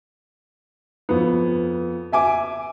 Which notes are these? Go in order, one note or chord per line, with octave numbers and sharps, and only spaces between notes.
F2 B3
E5 G#5 D6